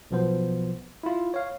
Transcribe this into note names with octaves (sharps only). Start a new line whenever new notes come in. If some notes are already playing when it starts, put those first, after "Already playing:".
B1 B2 F3 B3 C5
E4 F4
C#5 F5